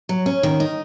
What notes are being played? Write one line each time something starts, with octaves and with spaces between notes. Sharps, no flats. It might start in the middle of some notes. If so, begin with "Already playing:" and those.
F#3
C#4
D#3
D#4